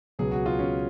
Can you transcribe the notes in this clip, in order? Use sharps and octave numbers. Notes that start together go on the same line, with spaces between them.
C#2 B2 F#3 G#4
F#4
F4
C#4